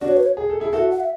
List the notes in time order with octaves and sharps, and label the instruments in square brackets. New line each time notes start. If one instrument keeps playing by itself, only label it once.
[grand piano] D4 F#4 [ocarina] D5
[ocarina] C#5
B4
C#5
[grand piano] G#4
A4
E4 G#4
[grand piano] F#4 A4 [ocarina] E5
[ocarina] F#5
E5